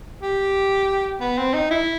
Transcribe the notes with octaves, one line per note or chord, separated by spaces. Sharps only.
G4
B3
C4
D#4
E4